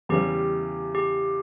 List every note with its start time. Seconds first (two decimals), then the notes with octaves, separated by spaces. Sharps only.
0.09 E2 C#3 E3 G3 G4
0.95 G4